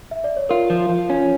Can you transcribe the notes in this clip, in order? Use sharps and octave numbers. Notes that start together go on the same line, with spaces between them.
E5
D5
C#5
F4 A#4
F3
F3
C#4